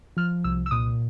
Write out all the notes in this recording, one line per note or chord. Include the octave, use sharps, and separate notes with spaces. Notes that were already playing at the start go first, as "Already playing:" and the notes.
F3 F6
C2 E6
E6
A#2 D#6